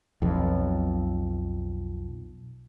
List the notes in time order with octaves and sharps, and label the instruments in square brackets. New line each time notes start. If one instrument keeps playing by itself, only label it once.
[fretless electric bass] B1 F2